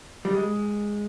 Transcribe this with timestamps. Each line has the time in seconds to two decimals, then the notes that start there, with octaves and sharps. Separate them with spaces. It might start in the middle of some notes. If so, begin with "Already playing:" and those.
0.25 G3
0.34 G#3